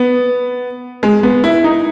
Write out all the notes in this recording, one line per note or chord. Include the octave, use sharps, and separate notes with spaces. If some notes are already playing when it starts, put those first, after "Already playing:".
Already playing: B3
G#3
B3
E4
D#4